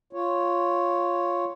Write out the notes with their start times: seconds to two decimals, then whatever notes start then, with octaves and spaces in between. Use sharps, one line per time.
0.13 F4 C#5